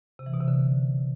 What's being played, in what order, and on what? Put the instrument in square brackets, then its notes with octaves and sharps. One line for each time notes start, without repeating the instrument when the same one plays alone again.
[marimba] C3
E3
B2
C3
D3